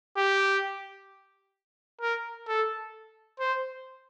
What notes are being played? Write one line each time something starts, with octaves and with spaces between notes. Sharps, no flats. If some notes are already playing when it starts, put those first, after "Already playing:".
G4
A#4
A4
C5